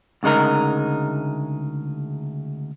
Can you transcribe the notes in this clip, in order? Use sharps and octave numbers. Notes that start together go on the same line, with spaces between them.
D2 C#3 G#3 D#4 A#4